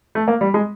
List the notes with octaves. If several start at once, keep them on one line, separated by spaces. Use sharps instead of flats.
A3
A#3
G3
G#3